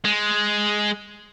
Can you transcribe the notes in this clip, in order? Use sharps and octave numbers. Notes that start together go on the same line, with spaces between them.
G#3